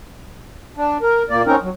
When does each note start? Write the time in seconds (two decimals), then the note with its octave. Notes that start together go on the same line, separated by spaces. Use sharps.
0.77 D4
1.01 A#4
1.30 A#2 A#3 D5
1.46 C4 C#4 D#4 A#4
1.62 F#3